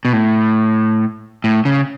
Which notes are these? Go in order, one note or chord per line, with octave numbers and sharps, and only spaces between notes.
B2
A2
A2
C#3